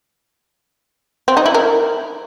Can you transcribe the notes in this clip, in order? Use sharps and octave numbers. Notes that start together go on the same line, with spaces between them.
C4
D#4
E4
A#4